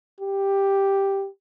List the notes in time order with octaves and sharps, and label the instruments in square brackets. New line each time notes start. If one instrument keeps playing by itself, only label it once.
[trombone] G4